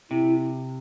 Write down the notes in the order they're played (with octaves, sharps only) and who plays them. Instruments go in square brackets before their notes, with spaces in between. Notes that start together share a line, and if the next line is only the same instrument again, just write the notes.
[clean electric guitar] C3 [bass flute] E4